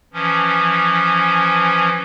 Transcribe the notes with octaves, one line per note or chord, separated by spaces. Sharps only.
E3 F3 C#4